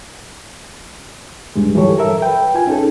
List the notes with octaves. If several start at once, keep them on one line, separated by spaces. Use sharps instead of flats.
D2 G2 G#3
E3 F#3 G3 G4 A4 C#5
A4 A#4 E5
B4 G5
F4 G#5
C#4 D#4 G#4 A4